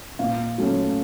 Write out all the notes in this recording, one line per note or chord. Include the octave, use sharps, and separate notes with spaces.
A#2 F5
F#3 A3 C#4